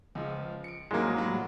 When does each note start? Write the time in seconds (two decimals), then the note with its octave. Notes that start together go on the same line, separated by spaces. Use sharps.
0.15 C#2 F3
0.64 C#7 D7
0.91 A1 F3 F#3 G#3 A#3
1.16 A2 F#3 G3